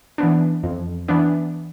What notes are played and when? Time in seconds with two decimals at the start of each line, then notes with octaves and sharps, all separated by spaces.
0.18 E3 B3 D4
0.63 F2
1.08 E3 B3 D4